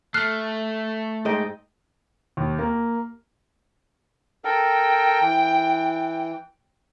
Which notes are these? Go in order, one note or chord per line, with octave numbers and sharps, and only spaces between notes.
A3 F6 F#6 C7
G#2 D#5 G5
D#2
A#3
A4 A#4 G5
E3